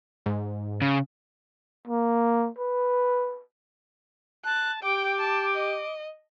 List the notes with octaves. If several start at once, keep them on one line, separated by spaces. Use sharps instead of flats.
G#2
C#3
A#3
B4
A5 F#6
G4 G5 D6
A5
D#5